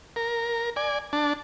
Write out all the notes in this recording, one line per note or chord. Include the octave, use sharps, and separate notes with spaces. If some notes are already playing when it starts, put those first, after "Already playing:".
A#4
D5 G#5
D4 A5